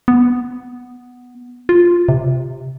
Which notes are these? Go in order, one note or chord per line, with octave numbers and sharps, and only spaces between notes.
B3
F4
C3